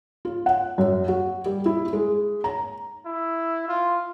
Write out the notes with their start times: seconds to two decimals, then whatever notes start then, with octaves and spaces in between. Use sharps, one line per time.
0.25 F4
0.46 F#5
0.78 F#2
1.08 F#4
1.46 G3
1.66 E4
1.93 G#3
2.44 A#5
3.05 E4
3.68 F4